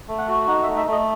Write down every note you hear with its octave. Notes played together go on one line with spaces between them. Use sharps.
A3
F#5
F#4
D#4 F#5
E5
A3
E5
A3
D#5